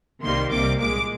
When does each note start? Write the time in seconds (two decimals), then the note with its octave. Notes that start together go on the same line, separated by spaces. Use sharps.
0.23 C2 C3 D#3 G3 A#3 C6
0.51 C2 C3 G3 A#3 D6
0.79 C2 A#2 G#3 D6